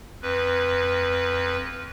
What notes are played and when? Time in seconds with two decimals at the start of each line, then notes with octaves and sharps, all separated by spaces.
0.22 F2 B4